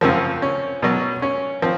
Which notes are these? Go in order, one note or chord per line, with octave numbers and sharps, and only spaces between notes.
F#2 C#3 F3 C4
C#4
B2 F#3
C#4
F3 C4